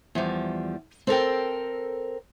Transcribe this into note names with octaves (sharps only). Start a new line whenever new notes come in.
E2 F3 G3
C4 A4 A#4 G5